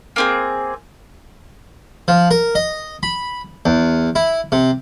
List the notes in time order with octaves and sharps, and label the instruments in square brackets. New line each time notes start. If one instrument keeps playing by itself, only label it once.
[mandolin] A#3 C4 G#4
[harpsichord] F3
A#4
D#5
B5
E2
E4
C3